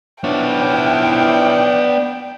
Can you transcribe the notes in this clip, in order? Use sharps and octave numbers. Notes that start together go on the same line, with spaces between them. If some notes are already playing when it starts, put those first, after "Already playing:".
E3 F3 B3 D4 E4 C#5 G5